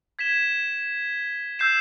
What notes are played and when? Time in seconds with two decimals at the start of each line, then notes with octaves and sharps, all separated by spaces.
0.19 G#6 B6 E7 G7
1.59 E6 G6 C7 E7